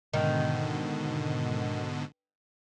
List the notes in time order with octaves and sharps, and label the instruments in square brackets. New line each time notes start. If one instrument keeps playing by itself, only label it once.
[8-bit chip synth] G#2 B2 D3 [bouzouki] D#3